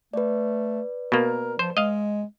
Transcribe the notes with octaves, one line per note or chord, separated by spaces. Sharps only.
A3 B4 D5
B2 A#3 A#4
F3 C5
G#3 D#5 F5